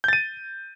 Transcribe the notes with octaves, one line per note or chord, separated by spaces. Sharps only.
G6 A6 D#7